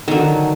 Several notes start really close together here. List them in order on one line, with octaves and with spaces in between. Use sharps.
D#3 D3 F#3